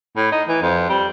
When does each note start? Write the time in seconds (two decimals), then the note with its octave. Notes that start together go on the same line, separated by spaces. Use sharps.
0.16 A2
0.32 D#4
0.48 E3
0.62 F2
0.89 G3